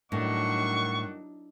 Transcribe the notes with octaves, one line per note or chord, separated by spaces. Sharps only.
A2 D#3 F#3 G3 D4 D#4 F#5 C#6